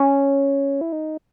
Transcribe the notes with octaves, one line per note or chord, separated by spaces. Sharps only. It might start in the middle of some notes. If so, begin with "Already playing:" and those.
Already playing: C#4
E4
D#4